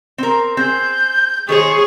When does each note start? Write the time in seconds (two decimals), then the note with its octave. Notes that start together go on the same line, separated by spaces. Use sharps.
0.18 C4 A#4
0.57 C4 G#4 G6
1.49 D#3 G#4 C5 C#5 C#6